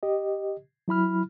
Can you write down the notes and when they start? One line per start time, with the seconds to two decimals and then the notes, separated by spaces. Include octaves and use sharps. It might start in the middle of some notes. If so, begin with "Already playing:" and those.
0.03 G4 D#5
0.88 F#3 E4 B5 F6